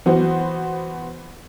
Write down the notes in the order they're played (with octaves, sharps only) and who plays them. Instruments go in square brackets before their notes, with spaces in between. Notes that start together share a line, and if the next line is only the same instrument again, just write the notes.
[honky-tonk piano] E3 B3 F#4 C5